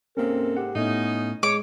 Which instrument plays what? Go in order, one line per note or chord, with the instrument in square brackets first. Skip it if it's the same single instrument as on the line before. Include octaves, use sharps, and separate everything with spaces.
[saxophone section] G#2 C3 A4 [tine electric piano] A#3 C4 C#4 [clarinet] A#4
[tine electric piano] G4 F#5
[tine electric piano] A2 A3 [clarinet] B3 [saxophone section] C#4 D#4
[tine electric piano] G#3 [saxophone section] C#5 [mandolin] D6